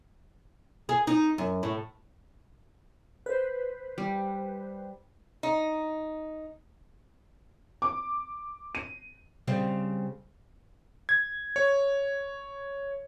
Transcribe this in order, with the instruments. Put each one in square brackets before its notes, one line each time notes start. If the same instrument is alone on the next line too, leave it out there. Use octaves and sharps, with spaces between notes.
[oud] G#4
D#4
F#2
A2
[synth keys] B4 C5
[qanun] G3
[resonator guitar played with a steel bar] D#4
[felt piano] D6
D#7
[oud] C#3 G3 C4
[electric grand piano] G#6
C#5